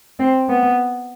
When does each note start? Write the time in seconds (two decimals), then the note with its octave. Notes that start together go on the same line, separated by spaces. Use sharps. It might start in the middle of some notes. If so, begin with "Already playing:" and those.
0.20 C4
0.49 B3